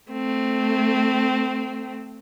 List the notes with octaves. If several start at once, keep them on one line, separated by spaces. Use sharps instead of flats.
A3 C4